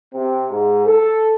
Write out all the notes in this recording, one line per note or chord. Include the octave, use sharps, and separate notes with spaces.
C3
G#2
A4